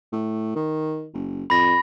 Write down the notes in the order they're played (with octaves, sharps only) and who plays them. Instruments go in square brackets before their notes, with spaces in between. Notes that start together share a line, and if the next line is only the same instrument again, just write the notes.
[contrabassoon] A2
D#3
F#1
[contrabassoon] F2 [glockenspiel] B5 A#6